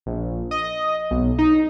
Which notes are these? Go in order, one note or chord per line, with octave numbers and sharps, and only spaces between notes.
A#1
D#5
B1
D#4